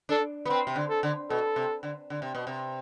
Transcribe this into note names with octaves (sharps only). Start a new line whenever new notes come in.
D4 A4
B3
C4 B4
C3
D3
A4
D3
B2 A4
C3
D3
D3
C3
B2
C3